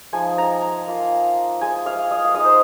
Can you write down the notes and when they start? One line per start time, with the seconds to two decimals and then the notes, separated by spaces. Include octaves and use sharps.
0.13 F3 G#3 D#4 G#5
0.38 A#5
0.63 A#5
0.87 A#3 F4
1.61 G#3 F4 G#5
1.86 F5
2.11 D#5
2.25 F5
2.35 G#3 D#4 D#5
2.45 C5